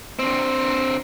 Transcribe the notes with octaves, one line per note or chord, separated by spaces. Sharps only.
D3 C4